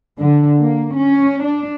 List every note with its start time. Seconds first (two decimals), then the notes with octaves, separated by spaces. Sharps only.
0.18 D3
0.59 A#3
0.95 C#4
1.44 D4